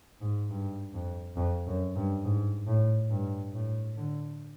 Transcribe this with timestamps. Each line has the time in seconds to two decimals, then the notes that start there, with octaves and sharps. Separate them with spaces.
0.22 G#2
0.50 G2
0.94 F2
1.37 F2
1.67 F#2
1.96 G2
2.24 G#2
2.67 A2
3.11 G2
3.54 A2
3.98 D3